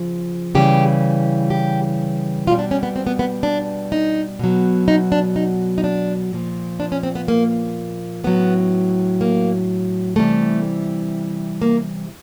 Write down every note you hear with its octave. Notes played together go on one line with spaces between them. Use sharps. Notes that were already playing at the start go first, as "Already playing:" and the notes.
Already playing: C#3 F3
C#3 E3 G3 G4
G4
B2 G3 C#4 F4
D4
C#4
B3
C4
B3
B3
D4
D#4
B2 F#3
D#4
D4
D#4
D#4
D4
A#2 F3
D4
C#4
C4
B3
A#3
A2 F#3 B3
A#3
C3 E3 G3 A3
A#3